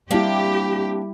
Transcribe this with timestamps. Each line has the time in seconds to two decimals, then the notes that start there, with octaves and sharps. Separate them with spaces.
0.11 G3 A#3 C4 D4 E4 G4